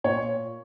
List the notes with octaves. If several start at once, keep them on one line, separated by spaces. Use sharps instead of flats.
A#2 C#5